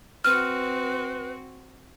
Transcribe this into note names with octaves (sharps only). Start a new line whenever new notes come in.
C4 F#4 B4 F6